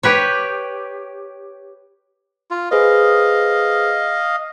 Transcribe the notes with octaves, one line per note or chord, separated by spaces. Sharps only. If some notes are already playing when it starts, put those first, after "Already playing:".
G4 B4 C#5
F4
G#4 B4 C5 D#5 F5